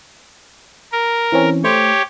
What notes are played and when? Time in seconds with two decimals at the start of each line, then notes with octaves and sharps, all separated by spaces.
0.92 A#4
1.32 E3 C4 C#4
1.64 A3 G4 C5 C#5